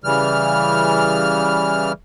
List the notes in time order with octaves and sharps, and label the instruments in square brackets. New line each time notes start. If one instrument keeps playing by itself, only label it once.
[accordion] C#3 E3 G3 F6